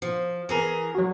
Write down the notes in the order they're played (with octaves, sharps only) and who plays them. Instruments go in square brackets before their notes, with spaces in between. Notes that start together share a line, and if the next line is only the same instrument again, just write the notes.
[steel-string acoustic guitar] F3
E3 G#4 A#4
[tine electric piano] F#3 F#4